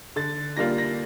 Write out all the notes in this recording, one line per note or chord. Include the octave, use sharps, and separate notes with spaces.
D3 A6
G3 A#3 D4 F4 A#6
A#6